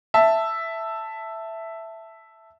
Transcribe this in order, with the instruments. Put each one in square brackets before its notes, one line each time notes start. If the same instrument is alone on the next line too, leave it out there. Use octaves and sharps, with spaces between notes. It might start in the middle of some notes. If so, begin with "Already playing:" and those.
[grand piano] E5 A5